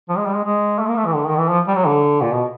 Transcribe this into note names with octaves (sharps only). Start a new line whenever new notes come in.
F3
G#3
G3
G#3
G#3
A3
A#3
A3
E3
D3
D#3
E3
F3
G3
F#3
D3
A#2
B2